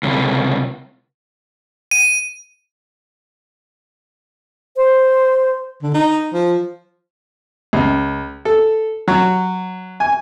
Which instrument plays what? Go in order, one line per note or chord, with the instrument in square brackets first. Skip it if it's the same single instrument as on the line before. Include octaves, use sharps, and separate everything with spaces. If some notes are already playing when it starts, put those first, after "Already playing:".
[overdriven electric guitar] C#2 C3
[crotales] D#7
[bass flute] C5
[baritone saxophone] D3
D#4
F3
[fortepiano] C#2
A4
F#3
G#5